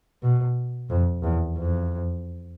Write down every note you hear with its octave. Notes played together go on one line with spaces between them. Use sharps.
B2
F2
E2
F2